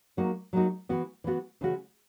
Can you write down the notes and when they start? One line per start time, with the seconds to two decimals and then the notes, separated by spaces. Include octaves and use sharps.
0.17 F#3 A#3 D#4 F#4
0.53 F#3 A#3 D#4 F#4
0.89 E3 B3 F#4
1.24 E3 B3 F#4
1.61 C#3 E3 G#3 C#4 F#4